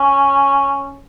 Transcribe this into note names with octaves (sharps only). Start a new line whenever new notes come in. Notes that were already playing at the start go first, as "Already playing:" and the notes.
Already playing: C#4